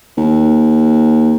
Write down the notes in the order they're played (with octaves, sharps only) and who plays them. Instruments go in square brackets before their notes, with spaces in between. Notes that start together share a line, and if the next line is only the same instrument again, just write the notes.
[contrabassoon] D#2